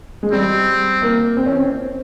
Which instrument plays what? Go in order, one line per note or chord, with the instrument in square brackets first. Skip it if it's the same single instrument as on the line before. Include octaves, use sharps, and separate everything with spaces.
[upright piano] G#3
[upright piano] G3 [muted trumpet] C4
[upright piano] A#3
C4
C#4
C4